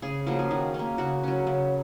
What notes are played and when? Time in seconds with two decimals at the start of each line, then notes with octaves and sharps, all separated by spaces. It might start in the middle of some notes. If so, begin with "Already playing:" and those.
0.02 C#3 G#4
0.26 F3 A#3 C#4 F#4
0.39 G#4
0.51 D#3 F#4
0.74 C#4
0.79 A#3
0.98 C#3 F#4
1.23 F#3 C#4
1.47 C#3